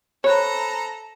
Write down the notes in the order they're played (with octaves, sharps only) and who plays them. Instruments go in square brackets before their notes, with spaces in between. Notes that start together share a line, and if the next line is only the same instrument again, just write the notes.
[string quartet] A4 A#5 [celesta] C5 B5 F#6 [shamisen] C#5